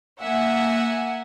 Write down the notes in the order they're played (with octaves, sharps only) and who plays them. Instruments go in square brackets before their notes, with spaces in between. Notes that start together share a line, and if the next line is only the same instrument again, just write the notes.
[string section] A#3 E5 F#5 G#5